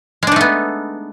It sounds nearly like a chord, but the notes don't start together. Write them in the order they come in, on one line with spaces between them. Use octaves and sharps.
G#3 D4 D#4 A3 B3